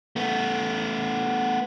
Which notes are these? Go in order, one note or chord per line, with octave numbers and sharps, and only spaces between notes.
A3 B3